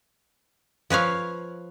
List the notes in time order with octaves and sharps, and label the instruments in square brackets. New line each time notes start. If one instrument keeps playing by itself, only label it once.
[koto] F3 B4 C#5 F5